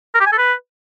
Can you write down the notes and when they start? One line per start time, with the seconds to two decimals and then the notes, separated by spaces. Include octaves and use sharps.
0.14 A#4
0.20 G4
0.26 G#5
0.32 A4
0.38 B4